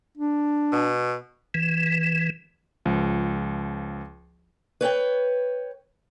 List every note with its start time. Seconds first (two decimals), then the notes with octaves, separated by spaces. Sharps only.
0.17 D4
0.72 B2
1.54 E3
2.85 C#2 F3
4.81 B4 C#5 F#5 G5